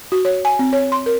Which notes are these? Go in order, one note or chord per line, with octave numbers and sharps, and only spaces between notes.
F#4
C#5
G#5
C4
C#5
C6
A#4